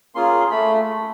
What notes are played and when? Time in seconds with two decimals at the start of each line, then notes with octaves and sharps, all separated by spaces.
0.15 A#3 C#4 F4 G#4 C6
0.51 A3 B5